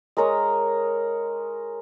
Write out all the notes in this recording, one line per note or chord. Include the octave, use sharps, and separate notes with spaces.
G#3 A#4 C#5 D#5